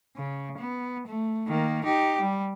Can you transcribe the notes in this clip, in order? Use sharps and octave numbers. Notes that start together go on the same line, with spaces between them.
C#3
B3
A3
D#3 A#3
D#4 G4
G3